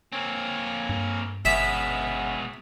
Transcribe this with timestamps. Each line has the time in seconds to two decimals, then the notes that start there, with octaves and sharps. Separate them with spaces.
0.12 A#3 C4 C#5 G#5
0.89 G2
1.45 G1 B2 G#3 B3 C#4 E5